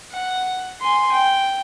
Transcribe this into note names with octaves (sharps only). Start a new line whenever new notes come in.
F#5
G#5 C6
G5